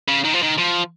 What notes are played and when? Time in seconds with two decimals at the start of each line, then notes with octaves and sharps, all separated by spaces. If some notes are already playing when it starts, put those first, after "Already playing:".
0.08 C#3
0.24 D#3
0.34 F3
0.42 D#3
0.58 F3